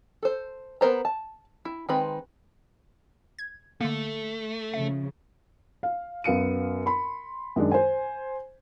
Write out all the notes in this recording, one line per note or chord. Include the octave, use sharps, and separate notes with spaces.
A4 C5
B3 A#4 C5 A#5
A5
E4
D#3 G#3 C4 B4 B5
G#6
D3 A3 A#3
C#3 F3 E5
F5
F#2 B3 F5 C#7 D#7
B5 C6
F#2 D#3 G#3 D4
C5 G#5